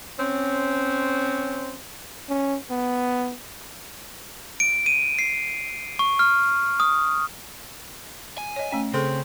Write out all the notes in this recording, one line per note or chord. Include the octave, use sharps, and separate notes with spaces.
C4 C#4
C#4
B3
D7
D#7
C7
C#6
F6
D#6
G#5
C#5 D#5
A3 C#4 G5
C#3 C4 G#4 A4